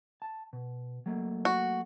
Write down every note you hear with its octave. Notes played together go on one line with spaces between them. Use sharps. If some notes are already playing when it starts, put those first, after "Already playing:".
A5
B2
F#3 A3 A#3
F#4